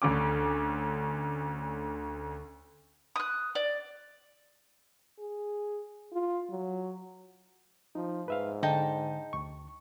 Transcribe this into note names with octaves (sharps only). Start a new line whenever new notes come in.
D2 D3 C#4 D6
D#6 F#6
D5
G#4
F4
F#3
F3 D#4
G#2 B4 E5 F5
D3 D#4 G5 A5
D2 C#6